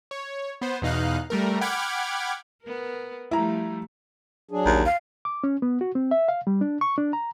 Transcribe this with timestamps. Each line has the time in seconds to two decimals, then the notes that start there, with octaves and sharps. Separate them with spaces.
0.11 C#5
0.61 B3 C5
0.82 E2 B2 D#4 F5 F#6
1.30 G3 A3 A#4
1.61 F#5 G5 B5 D6 F6 G#6
2.63 B3 A#4
3.31 F3 G3 A3 E4 A#5
4.51 F#3 D4 G#4
4.65 A#1 D#2
4.85 F5
5.25 D6
5.44 C#4
5.62 B3
5.81 F#4
5.95 C4
6.11 E5
6.28 F5
6.47 G3
6.61 D4
6.81 C#6
6.98 D4
7.13 A#5